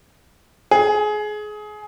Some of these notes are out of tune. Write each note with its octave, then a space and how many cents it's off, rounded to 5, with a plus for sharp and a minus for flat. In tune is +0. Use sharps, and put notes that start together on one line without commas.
G#4 +25